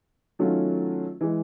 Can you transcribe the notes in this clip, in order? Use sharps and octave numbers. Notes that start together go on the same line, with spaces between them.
D#3 F#3 A3 C#4 F4
E3 G#3